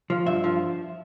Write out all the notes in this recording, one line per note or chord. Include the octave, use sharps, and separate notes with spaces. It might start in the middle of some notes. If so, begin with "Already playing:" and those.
F3
G2 E5
F3